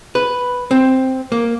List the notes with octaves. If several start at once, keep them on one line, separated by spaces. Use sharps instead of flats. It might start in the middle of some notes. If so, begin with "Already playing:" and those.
B4
C4
A#3